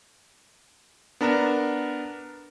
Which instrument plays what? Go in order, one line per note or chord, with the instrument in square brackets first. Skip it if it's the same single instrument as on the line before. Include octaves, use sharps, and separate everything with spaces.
[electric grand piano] B3 D4 A#4 A#5 E7